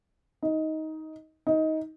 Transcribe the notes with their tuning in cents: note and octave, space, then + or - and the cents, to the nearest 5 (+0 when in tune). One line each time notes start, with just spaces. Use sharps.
D#4 +15
D#4 +20